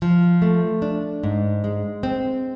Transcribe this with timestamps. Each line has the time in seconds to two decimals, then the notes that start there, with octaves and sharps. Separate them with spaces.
0.02 F3
0.42 A3
0.82 D4
1.23 G#2
1.64 G#3
2.03 C4